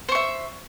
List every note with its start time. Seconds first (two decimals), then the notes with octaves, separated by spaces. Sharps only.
0.09 C5
0.12 C#6
0.15 E5